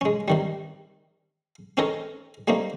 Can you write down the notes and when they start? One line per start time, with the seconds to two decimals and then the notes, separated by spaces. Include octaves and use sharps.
0.01 G#3 C#4
0.28 C3 D#3 G3
1.77 C4 C#4 D#4 A4 A#4 C#5
2.48 G3 A3 A#3 C4 D#4